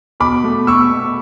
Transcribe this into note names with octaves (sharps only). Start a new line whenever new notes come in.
B2 B5 D6
A3
B2 C#6 E6
B2